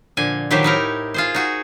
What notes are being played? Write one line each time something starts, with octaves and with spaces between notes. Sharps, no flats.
A#2 D3 F3 G#5
D#3 F3 F#3 G4 B4 C5
A2 D#4 E4 A#4
F4 G#4 C5
D#4 F#4 G#4